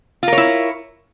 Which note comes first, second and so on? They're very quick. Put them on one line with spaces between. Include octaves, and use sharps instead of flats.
F4 A#4 C#5 E4